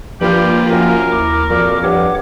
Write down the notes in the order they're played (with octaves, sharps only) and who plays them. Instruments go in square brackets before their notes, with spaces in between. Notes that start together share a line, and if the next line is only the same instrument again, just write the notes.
[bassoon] G2 [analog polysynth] F3 A#3 F4 [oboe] G4 [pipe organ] G5 B5
[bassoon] F#2 [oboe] A#4 [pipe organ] G#5
[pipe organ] D#2 E4 D6
[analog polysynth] F2 [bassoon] A#2 [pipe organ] F#4 D6
[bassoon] G2 [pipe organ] C#5 F#5 D6